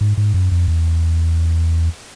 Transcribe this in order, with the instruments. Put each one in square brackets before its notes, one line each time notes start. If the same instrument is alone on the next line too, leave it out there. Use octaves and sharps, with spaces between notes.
[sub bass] G#2
G#2
F#2
F2
E2